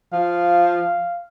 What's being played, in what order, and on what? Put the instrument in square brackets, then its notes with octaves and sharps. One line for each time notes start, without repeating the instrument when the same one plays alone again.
[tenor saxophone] F3 [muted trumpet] F5